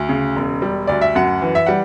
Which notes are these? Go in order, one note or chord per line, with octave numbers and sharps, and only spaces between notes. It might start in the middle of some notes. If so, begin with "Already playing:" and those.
Already playing: D2
C#3
E1
G3
D2 D5
E5
F#2 F#5
E3
E5
G3 F#5